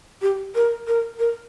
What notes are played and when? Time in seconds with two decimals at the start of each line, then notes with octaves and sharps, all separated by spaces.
0.21 G4
0.54 A#4
0.87 A#4
1.19 A#4